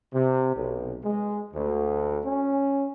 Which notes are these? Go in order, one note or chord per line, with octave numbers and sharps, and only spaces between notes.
C3
B1
G#3
D2
C#4